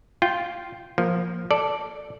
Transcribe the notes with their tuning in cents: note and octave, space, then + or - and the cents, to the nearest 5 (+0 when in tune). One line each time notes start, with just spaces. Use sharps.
F4 +0 G5 -10
F3 +0 A#3 +0
A4 +0 D5 +0